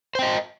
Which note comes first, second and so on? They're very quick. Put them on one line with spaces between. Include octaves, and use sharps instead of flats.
C5 G5 D#5